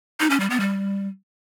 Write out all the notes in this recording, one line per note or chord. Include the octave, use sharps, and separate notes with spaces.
D#4
C#4
G3
B3
G3